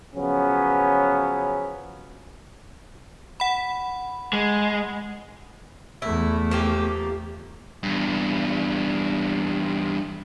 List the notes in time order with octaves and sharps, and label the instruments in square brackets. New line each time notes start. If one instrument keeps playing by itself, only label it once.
[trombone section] C#3 F3 F#3 B3 C#4
[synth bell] F#5 B5
[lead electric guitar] G#3
[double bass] E2 A3 [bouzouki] E4
[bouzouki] F3 A#3 G4
[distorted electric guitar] E2 G2